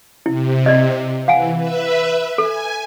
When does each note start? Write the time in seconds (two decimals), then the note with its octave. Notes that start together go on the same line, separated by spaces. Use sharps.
0.26 C3 E4
0.66 D5 D#5
1.28 E3 F5 F#5 G#5
1.57 B4 E5
2.38 A4 G#5